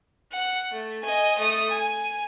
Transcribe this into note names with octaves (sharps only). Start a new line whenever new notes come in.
F#5
A3
D#5 G#5
A3 D#6
G#5